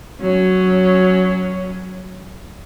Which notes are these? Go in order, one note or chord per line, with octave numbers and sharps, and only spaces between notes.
F#3 C#4